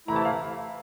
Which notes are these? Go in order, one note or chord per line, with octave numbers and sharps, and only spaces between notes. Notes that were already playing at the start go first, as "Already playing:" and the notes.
C3 E3 A3 E4 A#5
A5
F5